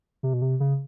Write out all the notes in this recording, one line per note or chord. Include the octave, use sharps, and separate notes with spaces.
C3
B2
C3
C#3